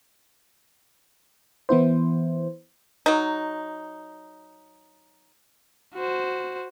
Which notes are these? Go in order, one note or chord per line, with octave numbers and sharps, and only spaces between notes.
E3 B3 E4 C5
F#3 D#4
F#4 C5